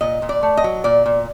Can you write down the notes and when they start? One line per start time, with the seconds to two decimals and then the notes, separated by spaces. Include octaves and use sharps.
0.01 A#2 D#5
0.22 A#2
0.29 D5
0.43 A3
0.57 D#5
0.64 F#3
0.84 A#2 D5
1.06 A#2